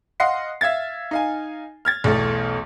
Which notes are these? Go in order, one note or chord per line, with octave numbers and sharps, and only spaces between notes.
D#5 F5 F#5 C6 C7
E5 F5 G#6 A6
D#4 F5 G#5
F6 G#6 A6
B1 E2 A3